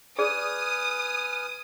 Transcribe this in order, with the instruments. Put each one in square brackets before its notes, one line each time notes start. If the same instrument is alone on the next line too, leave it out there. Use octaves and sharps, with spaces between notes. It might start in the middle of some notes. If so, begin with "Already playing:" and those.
[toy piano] G#4 D5 [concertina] B4 G#5 F6 [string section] D#6